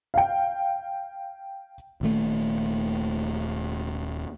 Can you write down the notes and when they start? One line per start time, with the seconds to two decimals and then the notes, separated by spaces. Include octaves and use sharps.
0.14 F5 G5
2.01 D#1 D#2 A3